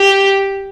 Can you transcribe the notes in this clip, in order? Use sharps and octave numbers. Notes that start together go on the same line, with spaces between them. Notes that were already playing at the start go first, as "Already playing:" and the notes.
Already playing: G4